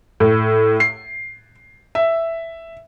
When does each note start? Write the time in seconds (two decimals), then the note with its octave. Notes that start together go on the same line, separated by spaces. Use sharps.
0.20 A2
0.80 C7
1.95 E5